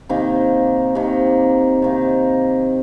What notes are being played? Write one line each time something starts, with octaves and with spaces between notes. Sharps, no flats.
C3 D#3 A#3
C3 D#3 A#3
C3 D#3 A#3